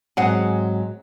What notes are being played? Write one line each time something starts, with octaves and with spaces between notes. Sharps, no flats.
G#2 F#3 C4 G#4 F#5